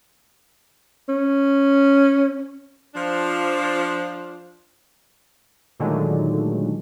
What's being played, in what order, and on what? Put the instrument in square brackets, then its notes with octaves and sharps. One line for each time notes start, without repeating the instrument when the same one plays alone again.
[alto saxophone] C#4
[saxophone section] F3 D4
[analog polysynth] A#2 D3 D#3 F#3 G#3 A3